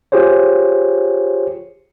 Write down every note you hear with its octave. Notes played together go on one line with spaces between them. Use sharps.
F4 G4 G#4 C5 C#5